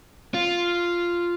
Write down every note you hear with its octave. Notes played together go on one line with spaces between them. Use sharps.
F4